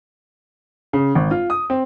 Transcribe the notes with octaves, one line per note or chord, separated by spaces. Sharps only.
C#3
G#1
F4
D#6
C4